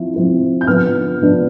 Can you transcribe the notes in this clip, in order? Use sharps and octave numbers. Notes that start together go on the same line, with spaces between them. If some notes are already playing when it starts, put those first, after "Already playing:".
Already playing: F3 C4 E4
F3 C4 E4
G6
D3 F3 B3 D4 F6
D3 F3 B3 D4